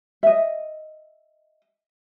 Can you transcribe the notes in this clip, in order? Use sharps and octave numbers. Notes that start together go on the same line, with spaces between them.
D#5 E5